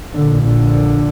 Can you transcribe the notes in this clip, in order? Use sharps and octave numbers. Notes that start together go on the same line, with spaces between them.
A#1 A#2 D3
D3